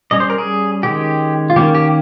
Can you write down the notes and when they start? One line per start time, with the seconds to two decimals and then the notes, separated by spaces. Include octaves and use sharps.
0.11 G3 C#4 D#5
0.20 C5
0.30 A#4
0.38 G#4
0.83 D#3 G#3 C#4 G4
1.50 F4
1.56 D#3 A#3 C#4 G4
1.75 G4